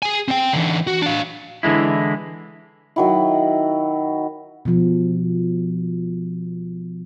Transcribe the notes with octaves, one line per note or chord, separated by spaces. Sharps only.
G#4 G#5
C4 G5
D3 E3
F#4
D4 F5
D3 E3 G#3 E4
D#3 F#3 E4
B2 F3